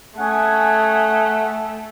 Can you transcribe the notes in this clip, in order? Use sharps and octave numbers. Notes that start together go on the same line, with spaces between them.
A3 C#4 F#5 G#5 D#6